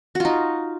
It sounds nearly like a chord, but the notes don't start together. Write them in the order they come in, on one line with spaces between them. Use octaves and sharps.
F#4 F4 D#4